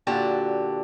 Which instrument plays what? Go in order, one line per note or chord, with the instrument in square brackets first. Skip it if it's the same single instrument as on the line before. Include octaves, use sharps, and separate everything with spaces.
[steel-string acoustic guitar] A#2 D3 F#4 G4 A5